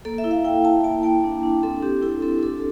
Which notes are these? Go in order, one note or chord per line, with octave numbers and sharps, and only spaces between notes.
A#3 A4
E5
E4
F5
E4 G5
E4 A5
A#3 A5
A#3 G5
D4
D4
C4 A4
C4 G4
E4 A4
C4 A4
D4 A4